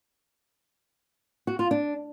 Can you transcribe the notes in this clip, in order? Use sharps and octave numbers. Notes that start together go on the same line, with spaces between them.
F#4
F4
D4